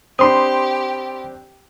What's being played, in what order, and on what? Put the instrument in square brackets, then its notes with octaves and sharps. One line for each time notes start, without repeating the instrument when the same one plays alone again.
[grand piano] C4 D4 [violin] G4 [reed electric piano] B5 C6 D#6